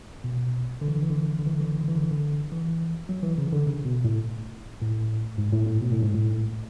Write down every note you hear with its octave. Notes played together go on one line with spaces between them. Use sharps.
B2
D3
E3
D3
E3
D3
E3
D3
E3
D3
E3
D3
E3
D3
E3
D3
E3
D3
E3
D3
E3
F#3
E3
C#3
E3
D3
C#3
B2
A2
A2
G#2
A2
A2
B2
A2
G#2
A2